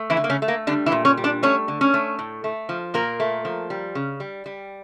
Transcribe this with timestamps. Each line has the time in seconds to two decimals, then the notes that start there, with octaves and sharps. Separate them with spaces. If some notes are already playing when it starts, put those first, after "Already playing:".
Already playing: A3
0.10 E3 E4
0.17 D3
0.24 A#3
0.30 C#3 C#4
0.42 A3
0.48 A#3
0.67 D3 G3 D4
0.86 E3 E4
0.92 A#2
1.05 C#4 C#5
1.17 G3
1.24 D4 D5
1.43 A3 C#4 C#5
1.68 D3
1.81 C#4 C#5
1.94 A3
2.19 A2
2.44 A3
2.69 F3
2.94 A#2 A#3 A#4
3.20 A3
3.45 F3
3.70 G3
3.95 C#3
4.20 G3
4.46 G3